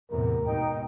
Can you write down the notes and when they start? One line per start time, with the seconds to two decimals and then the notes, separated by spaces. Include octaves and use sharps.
0.10 E2 A2 C3 A#4
0.44 D#2 G#2 B2 D#4 G5